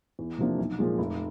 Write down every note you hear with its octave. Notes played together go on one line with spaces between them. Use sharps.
E2
C3 F3 A#3 D4
B1
A#2 F3 G#3
F1